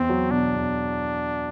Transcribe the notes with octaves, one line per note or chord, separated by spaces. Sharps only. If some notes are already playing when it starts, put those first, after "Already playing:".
Already playing: E2 C4
F#3
B2 D4
E2